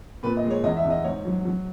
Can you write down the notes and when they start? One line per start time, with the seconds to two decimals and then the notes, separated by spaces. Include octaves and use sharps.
0.23 A#2 B4
0.37 D#5
0.44 G#3
0.50 C#5
0.63 E2 D#5
0.77 E5
0.84 E2
0.90 D#5
1.04 G#2 C#5
1.25 F#3
1.45 F#3